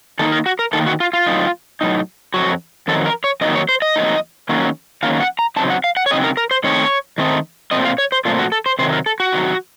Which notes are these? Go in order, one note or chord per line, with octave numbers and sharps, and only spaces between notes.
D#3 A#3 D#4 A4
A#4
F#4
A#4
D#3 A#3 D#4 A4
F#4
F4
F4
A2 F#3 C4 D#4
A2 F#3 C4 D#4
F2 D#3 F#3 F#4
F2 D#3 F#3 A4
A#4
C#5
F2 D#3 F#3 A#3 D#4 D#5
C#5
C5
D#5
F2 D#3 F#3 A#3 D#4
D#3 F#3 A#3 C#4
D#3 F#3 A#3 C#4 F5
F#5
A#5
C#3 F#3 C4 D#4 A5
F#5
F5
F#5
C#5
C#3 F#3 C4 D#4 D#5
A#4
A#4
C5
D#3 A3 C4 D#4 C#5
D#3 A3 C4 D#4
A#2 F3 A3 C4 D#5
F5
C#5
C5
A#2 F3 A3 C4 F4
F#4
A4
C5
C3 D#3 F#3 C5
A#4
A4
F#4
C3 D#3 F#3